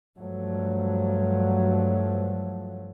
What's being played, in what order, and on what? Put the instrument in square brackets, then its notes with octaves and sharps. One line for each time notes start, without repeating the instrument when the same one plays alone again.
[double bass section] G2 F3 F#3 A3